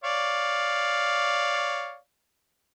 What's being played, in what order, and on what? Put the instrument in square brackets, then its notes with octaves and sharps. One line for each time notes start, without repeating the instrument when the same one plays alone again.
[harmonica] C#5 D5 F5